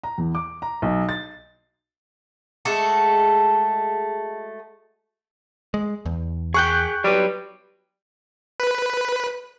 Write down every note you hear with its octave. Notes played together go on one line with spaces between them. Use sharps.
A#5
E2
D6
A#5
B1
A6
G#3 A3 F#4 A4
G#3
E2
G#4 G5 C#6 F#6 G6
F#3 G3 B4
B4